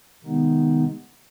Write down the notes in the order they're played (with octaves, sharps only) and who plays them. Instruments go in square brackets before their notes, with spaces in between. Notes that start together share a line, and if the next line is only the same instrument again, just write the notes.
[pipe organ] C3 D#3 G#3 B3 D#4